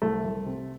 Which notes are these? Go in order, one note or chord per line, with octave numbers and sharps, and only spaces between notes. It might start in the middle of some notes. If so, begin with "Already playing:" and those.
C2 A3
C2
C3